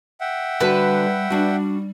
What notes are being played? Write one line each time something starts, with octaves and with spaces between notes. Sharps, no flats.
E5 F#5 G5
D3 G3 F#4 B4 A5
G3 D4 F#4